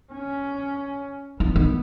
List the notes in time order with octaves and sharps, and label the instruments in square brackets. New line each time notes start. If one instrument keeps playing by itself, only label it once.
[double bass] C#4
[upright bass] E3 [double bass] B3
[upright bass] D#3